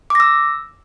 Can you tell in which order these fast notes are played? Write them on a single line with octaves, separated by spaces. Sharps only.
D6 A#6 E6